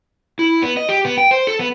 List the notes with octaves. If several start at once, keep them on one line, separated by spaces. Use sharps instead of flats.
E4
B3
D#5
G4
B3
G5
C5
A4
B3